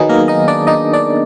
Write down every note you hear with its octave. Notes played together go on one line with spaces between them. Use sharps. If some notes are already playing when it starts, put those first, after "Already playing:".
Already playing: D#3 F#3 B3 D#4 G#4
A#3 A#4
D#4 D#5
D4 D5
D#4 D#5
D4 D5